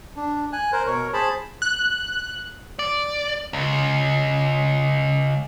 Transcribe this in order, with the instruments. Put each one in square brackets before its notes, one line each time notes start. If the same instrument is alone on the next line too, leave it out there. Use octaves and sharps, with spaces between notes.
[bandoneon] D4
G#5 F#6
A#4 C5
B2 A#4 C#5
G#4 C5 A5 B5
[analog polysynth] F#6
[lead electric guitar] D5
C#2